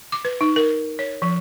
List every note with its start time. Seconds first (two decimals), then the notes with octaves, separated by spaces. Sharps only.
0.12 D6
0.25 B4
0.41 D#4
0.56 A#4
0.99 C#5
1.22 F3